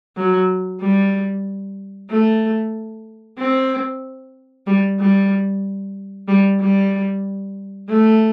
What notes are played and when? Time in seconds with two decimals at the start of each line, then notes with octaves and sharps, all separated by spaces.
0.16 F#3
0.81 G3
2.10 A3
3.38 C4
4.67 G3
5.00 G3
6.28 G3
6.60 G3
7.89 A3